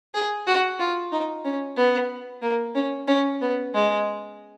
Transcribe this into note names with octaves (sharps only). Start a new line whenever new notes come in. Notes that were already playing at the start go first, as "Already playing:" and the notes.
G#4
F#4
F4
D#4
C#4
B3
A#3
C#4
C#4
B3
G#3